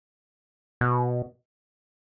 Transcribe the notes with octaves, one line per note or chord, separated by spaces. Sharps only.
B2